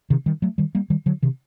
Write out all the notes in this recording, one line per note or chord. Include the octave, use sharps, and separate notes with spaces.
C3 D#3
D#3 G3
F#3 A3
D#3 G3
G3 A#3
D#3 G3
D3 F#3
C3 D#3